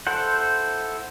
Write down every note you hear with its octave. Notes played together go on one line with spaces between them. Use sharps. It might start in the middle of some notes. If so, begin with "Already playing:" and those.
E4 A4 C5 F#5